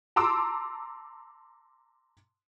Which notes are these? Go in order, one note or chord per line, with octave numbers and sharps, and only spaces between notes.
A5 A#5 C6 D6 E6